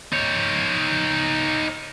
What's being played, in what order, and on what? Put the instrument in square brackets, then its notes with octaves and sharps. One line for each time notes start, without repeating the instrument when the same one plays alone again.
[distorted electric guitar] D#4 C#5